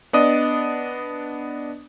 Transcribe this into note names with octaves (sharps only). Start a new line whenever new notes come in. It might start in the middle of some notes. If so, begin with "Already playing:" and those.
B3 D4 D5 D#5 D#6